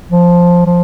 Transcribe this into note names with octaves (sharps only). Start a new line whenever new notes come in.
F3
F3